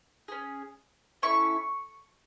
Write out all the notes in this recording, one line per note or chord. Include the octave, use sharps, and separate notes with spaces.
C#4 G#4
C#4 E4 A4 C#6